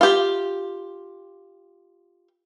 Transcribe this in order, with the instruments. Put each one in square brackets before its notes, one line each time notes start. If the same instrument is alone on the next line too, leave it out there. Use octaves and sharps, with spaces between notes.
[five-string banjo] F4 G4